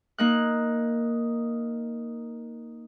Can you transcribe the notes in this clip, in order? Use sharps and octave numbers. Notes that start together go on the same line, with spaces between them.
A#3 D#4 F#6